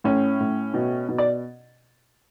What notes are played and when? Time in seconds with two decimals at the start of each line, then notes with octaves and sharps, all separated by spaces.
0.04 A2 C#4
0.40 A2
0.74 B2
1.09 B2
1.18 D5